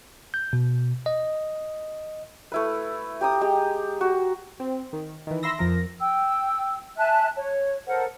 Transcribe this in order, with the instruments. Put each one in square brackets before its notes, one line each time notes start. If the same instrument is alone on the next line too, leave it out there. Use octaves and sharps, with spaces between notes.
[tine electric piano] G6
B2
D#5
[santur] A3 E4 B4
G4 A#5 D#6
G#3 G4
F#4
[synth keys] C4
D#3
D#3 E3
E5 B5 C6 E6 A#6
F2 F3 A#4 A#6
[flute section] G5 E6
E5 G#5 A5 F#6
C#5
A4 A#4 C5 F#5